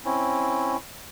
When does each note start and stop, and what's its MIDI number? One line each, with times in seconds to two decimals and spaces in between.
0.05 0.77 60
0.05 0.77 61
0.05 0.77 64